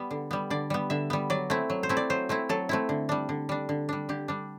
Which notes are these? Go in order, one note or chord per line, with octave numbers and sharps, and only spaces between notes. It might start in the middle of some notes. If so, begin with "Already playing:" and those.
Already playing: G3 B3
D3
G3 B3
D3 D5
G3 B3
D3 E5
G3 B3
F#3 D5
A3 C4 E4
F#3
C5
A3 C4 E4
D5
F#3 C5
A3 C4 E4
F#3 A4
A3 C4 E4
D3
G3 D4
D3
G3 D4
D3
G3 D4
D3 G4
G3 D4